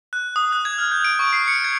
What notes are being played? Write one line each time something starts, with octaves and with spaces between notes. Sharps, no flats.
F#6
D#6
F#6
G#6
F6
G6
D7
C#6
C7
C#7
G#6